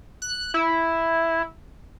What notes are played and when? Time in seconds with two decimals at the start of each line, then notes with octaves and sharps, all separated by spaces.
0.22 F#6
0.54 E4